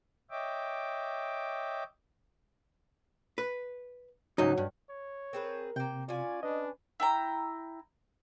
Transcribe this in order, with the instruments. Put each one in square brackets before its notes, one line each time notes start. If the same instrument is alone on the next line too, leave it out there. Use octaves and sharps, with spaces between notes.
[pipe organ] C#5 D#5 E5 G5 D6
[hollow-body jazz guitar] B4
[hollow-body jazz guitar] C#2 G#2 D#4 [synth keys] F#3
[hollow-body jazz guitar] G2
[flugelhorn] C#5
[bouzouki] C4 G#4 B4 [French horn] A#4
[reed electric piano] C3 [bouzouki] A#3 G5
[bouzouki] C#4 G#5 [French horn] F4 [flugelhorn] D5
[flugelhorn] D4 [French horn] B4 [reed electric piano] D#5
[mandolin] E4 G5 A#5